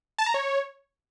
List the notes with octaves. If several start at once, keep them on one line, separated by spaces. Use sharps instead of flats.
A5
A#5
C#5